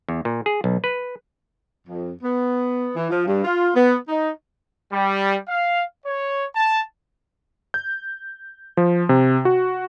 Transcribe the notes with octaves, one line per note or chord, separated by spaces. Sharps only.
E2
A#2
G#4
B1
B4
F2
B3
E3
F3
G2
F4
B3
D#4
G3
F5
C#5
A5
G6
F3
C3
F#4